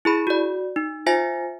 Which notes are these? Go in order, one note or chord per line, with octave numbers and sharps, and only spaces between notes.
E4 G#4 B5
F#4 D5
D#4
F4 C5 E5 G#5 A#6